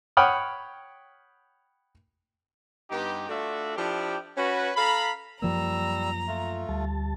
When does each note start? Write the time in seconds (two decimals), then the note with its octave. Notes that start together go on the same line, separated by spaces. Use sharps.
0.17 C#5 F#5 G5 B5 D#6 F6
2.91 G2 B3 D#4 G4
3.29 A3 D4 F4 F#4 D5 E5
3.77 F3 D4 E4 G4
4.37 C#4 F#4 B4
4.77 A4 F5 A#5 B5
5.42 F#2 F3 G3 A#3 A#5 E6
6.28 A3 F4
6.69 D2 G3 A5